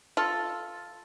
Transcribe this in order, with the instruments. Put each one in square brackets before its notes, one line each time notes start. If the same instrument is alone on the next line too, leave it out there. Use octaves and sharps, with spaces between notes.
[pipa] F4 A4